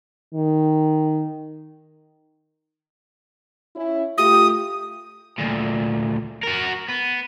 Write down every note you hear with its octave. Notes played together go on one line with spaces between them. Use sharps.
D#3
C#4 E4
A3 F4 G4 D#6
D2 A#2
F#4 A#4
B3